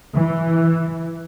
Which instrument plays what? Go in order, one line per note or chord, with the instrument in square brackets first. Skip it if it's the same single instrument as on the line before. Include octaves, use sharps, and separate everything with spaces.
[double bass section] E3